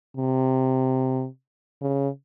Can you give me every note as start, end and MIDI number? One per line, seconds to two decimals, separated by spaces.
0.17 1.26 48
1.81 2.08 49